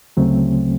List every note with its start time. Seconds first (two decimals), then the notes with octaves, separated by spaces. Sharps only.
0.17 D2 C#3 F#3 A3 C4